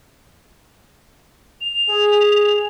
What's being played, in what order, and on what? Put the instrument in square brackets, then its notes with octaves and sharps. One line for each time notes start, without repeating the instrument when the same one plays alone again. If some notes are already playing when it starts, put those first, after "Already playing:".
[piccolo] F7
[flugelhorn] G#4